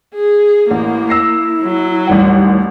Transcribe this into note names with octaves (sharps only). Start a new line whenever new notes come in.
G#4
A1 A#3 E4
E6 A#6 C7
F#3
A1 D#2 G3 F#5